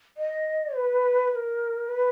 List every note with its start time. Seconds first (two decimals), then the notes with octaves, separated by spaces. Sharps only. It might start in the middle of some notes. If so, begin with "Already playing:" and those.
0.17 D#5
0.75 B4
1.31 B4
1.35 A#4
1.88 B4